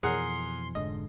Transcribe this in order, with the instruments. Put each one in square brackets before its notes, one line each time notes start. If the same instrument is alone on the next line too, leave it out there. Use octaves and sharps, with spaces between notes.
[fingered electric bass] F2 B2 E3 [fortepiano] G#4 A#4 F#5 [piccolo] C6
[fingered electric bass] F1 G#2 D3 [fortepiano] D#5